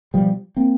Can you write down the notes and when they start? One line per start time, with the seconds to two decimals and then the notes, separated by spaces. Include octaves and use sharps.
0.14 B2 F3 G3
0.56 A#3 C4